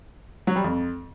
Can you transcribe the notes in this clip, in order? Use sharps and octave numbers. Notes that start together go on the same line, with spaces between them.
F#3
G3
F2